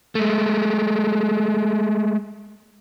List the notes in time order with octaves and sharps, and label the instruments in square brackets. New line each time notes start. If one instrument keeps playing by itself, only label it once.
[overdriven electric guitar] G#3 A3